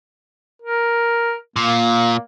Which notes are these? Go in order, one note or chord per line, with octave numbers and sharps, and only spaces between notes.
A#4
A#2 A#3